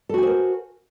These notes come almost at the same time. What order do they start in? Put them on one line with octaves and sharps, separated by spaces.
A4 F#4 G#5 C5 A#4